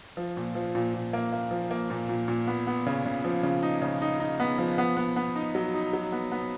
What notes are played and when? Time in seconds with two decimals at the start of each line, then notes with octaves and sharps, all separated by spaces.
0.17 F3
0.37 A#2
0.55 F3
0.75 A#2
0.94 A#2
1.13 A#3
1.33 A#3
1.51 F3
1.71 A#3
1.90 A#2
2.09 A#2
2.28 A#2
2.47 B3
2.67 B3
2.86 C#3
3.06 C#3
3.25 F3
3.43 C#3
3.63 D#4
3.82 C#3
4.02 D#4
4.20 D#4
4.40 B3
4.58 F3
4.78 B3
4.97 B3
5.16 B3
5.36 D#4
5.55 F#3
5.74 D#4
5.93 F#3
6.12 B3
6.32 B3